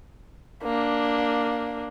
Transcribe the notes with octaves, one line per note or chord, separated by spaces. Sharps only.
A#3 D4